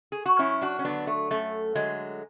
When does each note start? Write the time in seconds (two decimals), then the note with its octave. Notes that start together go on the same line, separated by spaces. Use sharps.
0.12 G#4
0.26 F#4
0.39 F#2 C#4 E4
0.62 D4 F#4
0.79 C#4
0.84 D3 F#3 B3 D4
1.07 A3
1.31 F#2 A3
1.75 D3 F#3 G#3